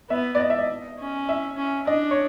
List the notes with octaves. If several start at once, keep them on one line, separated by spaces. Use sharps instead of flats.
B3 E5
D5
D#5
E5
D#5
C#4
E5
C#4
D4 D#5
C#5